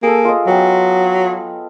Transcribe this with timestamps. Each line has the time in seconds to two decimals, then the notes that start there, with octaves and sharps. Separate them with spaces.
0.03 A#3 G#4 A4
0.25 F4 D#5
0.47 F#3 B3 F5 G5